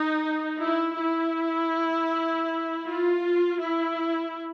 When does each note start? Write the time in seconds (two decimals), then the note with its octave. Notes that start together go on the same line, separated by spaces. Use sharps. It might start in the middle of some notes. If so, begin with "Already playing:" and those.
Already playing: D#4
0.61 E4
0.98 E4
2.85 F4
3.59 E4